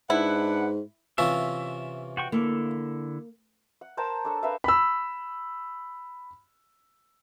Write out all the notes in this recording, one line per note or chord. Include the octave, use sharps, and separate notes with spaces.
G#2 D4 E4 B4 F#5
C3 E3 C#4 F4 E5
F#4 G5 C#6
D3 A#3 E4 A4
F#5
A#4 C5 G5 A5
D4 A4 C#5
A#4 B4 E5 F5
B5 E6